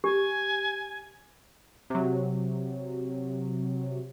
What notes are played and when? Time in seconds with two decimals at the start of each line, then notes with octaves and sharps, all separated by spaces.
0.04 G4 G#5
1.90 C3 F#3